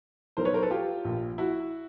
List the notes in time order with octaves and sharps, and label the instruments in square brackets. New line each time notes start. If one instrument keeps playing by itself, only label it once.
[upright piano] B1 B2 A#4 C5
B4 C#5
A#4 C5
A4 B4
F4 G4
A#1 A#2
E4 F#4